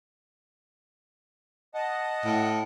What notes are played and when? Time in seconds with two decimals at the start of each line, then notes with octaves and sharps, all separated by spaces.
1.74 D#5 F#5 A5
2.25 A2